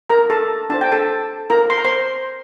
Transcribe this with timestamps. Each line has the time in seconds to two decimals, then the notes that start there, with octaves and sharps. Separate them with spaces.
0.10 A#4 A#5
0.30 A4 A5
0.70 D4 F4 C5 A5
0.81 G5
0.92 A4 A5
1.50 F4 A#4 A#5
1.70 C6
1.78 A#5
1.84 C5 C6